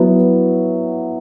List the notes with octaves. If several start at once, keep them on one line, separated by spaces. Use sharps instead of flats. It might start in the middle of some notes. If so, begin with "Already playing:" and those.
Already playing: F#3 B3 E4